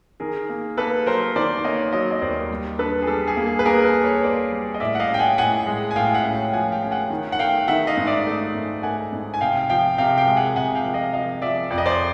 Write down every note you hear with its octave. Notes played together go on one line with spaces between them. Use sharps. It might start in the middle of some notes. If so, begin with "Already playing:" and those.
D#3 G#4 A#4
A#3
A#3 A4 B4
F#3 A#4 C5
D#3 C5 D5
A#3 C#5 D#5
F#3 C#5 D#5
D#5
D#2 C5 D5
G3
D4 A4 B4
G#4
G3 A4
G#4
A#3
G#4
B4
A#3 G#4 A#4
A4 B4
A#3
B4 C#5
A#3 C5 D5
G3
D#5
A2 D5 E5
F#5
D#5 F5
C#4 G5
F#5 G#5
A2 F#5 G#5
G#3
G#5
A2 F5 G5
E5 F#5
C#4
F5 G5
F3 F#5 G#5
F5 G5
C#4 G5
F#5 G#5
D#3
F#5
A3 F5 G5
D#3 E5 F#5
D#5 F5
G#2
D5 E5
A3
G#2
A3 F#5 G#5
G#2
G#5
C3 F5 G5
F3 F5 G5
C3 F5 G5
F5 G5
G#3
F#5 G#5
C3 F#5 G#5
F5 G5
F3
D#5 F5
F3 D#5 F5
F3 D5 E5
F2 D5
D#5
C5 D5